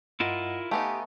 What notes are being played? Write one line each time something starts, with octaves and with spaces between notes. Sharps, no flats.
G2 E4 F4 A#4 D#5 F#5
A3 B3 D#4 G4 F5 G#5